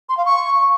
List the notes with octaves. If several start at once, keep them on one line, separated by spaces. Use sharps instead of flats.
C6
F5
C#6